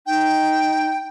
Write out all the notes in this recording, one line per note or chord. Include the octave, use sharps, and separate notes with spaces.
D#4 G5